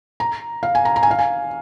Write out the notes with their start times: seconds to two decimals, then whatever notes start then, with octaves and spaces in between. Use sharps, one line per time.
0.20 A#5
0.63 F5
0.75 G#5
0.85 A#5
0.96 A#5
1.03 G#5
1.11 F5
1.19 G#5